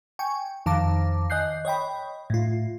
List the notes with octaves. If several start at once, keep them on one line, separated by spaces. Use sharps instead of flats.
G5 G#5 C#6
F2 D#3 F5 A5 D6 A#6
D#5 G#5 F#6 G6 C7
C#5 D#5 G5 B5
A2 F4